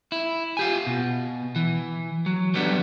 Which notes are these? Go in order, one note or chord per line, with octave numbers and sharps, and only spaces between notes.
E4
F4 G4 G#5
B2
E3
F#3
F#3 G3 B3 D4